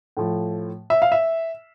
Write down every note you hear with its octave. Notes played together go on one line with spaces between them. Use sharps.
A2 F3
E5
F5
E5